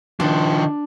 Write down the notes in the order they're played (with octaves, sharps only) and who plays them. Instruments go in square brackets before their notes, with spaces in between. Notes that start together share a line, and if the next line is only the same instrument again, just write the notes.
[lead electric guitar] D#3 F3 [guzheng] D4